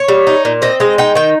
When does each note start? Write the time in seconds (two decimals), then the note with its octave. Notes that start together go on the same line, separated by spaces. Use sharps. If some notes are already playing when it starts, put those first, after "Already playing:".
Already playing: C#5
0.08 G3
0.27 D#4
0.45 A#2
0.62 C4 D#5
0.80 G#3 D#5
0.98 D#4 G5
1.15 D#3 G5